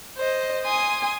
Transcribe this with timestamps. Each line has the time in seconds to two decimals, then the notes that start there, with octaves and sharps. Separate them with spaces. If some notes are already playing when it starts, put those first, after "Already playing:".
0.17 C5 D#5
0.64 G#5 C6 D#6